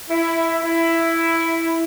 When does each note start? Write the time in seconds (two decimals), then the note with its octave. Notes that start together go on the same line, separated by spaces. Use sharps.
0.10 E4
0.62 E4